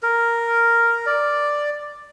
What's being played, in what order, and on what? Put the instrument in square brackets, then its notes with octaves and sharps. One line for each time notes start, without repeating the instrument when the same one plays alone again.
[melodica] A#4
D5